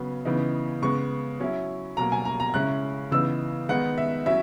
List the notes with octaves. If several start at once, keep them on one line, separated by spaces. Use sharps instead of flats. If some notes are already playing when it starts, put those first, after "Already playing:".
Already playing: C#3 F#3 B3
C#3 E3 B3 D#4
C#3 G#3 B3 C#6
F#3 C#4 E4
B2 F#3 A#3 A#5
G#5
A#5
A#5
C#3 G#3 C#4 E4 F#6
C#3 E3 B3 D#4 E6
D#3 G#3 B3 D#4 F#5
E5
F#3 C#4 E4 E5